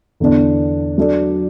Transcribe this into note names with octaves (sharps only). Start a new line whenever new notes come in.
E2 D3 B3 D4
F#3 D4 A4 D5